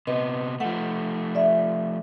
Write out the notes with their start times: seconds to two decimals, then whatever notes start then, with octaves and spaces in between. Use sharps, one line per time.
0.07 C3 B3 B4 D#5
0.60 F3 A3 F#5
1.35 D5 E5